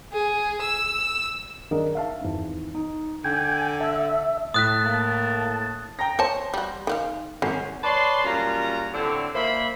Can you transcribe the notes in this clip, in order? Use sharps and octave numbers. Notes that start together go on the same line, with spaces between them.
G#4
E6
D#3 D4 G#4 A#4 D#5
E5 F5 A5
G#1 E2
D#4
D3 G5 G#5
E5 A5
A2 A5 D#6 F#6 B6
A#3
G5 A#5 A#6
C5 C#5 A5
G3 F#4
D#3 F#4 F5
G#1 F#3 C#4
B4 C#5 D5 A5 C6
F#2 A#2 G3 F4 A#5
A2 D3 C4
A#2 A#3 C5 E5 B5